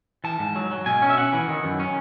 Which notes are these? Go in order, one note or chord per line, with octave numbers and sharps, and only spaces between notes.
E3 A5
G#2
F#3
F#3
B2 G#5
C#4
E5
C#4 F#5
E3
D#3
F#2
C#4